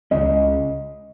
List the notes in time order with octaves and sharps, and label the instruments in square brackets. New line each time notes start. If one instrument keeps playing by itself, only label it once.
[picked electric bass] C#2 C#3 G#3 C#4 [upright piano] D#5